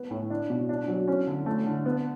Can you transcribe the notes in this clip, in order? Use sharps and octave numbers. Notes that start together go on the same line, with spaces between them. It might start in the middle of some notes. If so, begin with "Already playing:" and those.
Already playing: B3
A2
D4
B2
D4
F#3
C#4
D3
A3
D3
B3